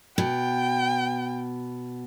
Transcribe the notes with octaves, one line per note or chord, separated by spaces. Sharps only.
B2 G5